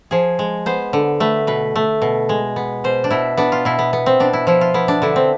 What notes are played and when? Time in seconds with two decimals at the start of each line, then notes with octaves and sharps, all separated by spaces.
0.11 F3 G#4
0.39 G#3
0.66 B3 C5
0.93 D3
1.20 A3 B4
1.47 B2 B4
1.76 A3
2.02 B2
2.29 G#3
2.56 B3
2.84 B2 C5
3.04 D4
3.11 B2 E4
3.37 B3 D4
3.52 F4
3.65 B2 E4
3.79 B3
3.93 B3
4.06 C4
4.20 B2 D4
4.33 E4
4.47 F3 E4
4.61 F4
4.74 B3 E4
4.88 D4
5.02 D3 E4
5.16 C4